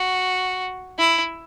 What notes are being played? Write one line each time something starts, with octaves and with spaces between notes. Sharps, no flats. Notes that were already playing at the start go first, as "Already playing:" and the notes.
Already playing: F#4
E4